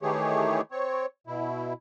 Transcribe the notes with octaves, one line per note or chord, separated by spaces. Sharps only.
D#3 E3 A3 G4 G#4 C#5
C4 C#5
B2 E4